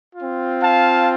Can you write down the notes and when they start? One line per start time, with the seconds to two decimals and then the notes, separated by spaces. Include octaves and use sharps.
0.16 C4 F4
0.61 F5 A5